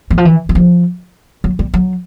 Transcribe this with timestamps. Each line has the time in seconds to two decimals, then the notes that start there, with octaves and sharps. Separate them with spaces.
0.10 E3
0.18 F3
0.25 E3
0.49 E3
0.55 F3
1.44 F#3
1.59 G3
1.74 F#3